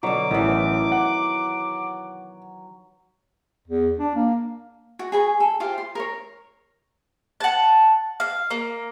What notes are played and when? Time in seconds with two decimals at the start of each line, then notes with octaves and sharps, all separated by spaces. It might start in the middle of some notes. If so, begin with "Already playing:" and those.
0.03 B2 D3 F#3 D6
0.31 A1 D#3 E3
0.92 F#5
3.68 E2
3.99 D4
4.15 A#3
4.99 F#4
5.12 G#4 G#5 B5 C#6
5.40 A4
5.60 F4 G4 C5 F5
5.78 C6
5.95 A#4 C#5
7.40 F#5 A5
8.20 F5
8.51 A#3